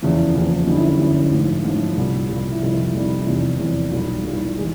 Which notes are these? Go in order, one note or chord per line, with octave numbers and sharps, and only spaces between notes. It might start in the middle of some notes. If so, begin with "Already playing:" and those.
F#1 E2 C#3 F3 E4
F#1 E2 C#3 F3
G1 F#2 D3 G3 D#4
E4
E4
G1 F#2 D3 G3 E4
A1 G#2 F3
A1 G#2 F3
C2 A#2 G3
C2 A#2 G3
E4
F2 C3 D#3 G3 D#4
E4
E4
F2 C3 D#3 G3
E4
E2 C3 F3 D#4
E2 C3 F3
B1 A#2 G3
B1 A#2 G3 E4
E3 G#3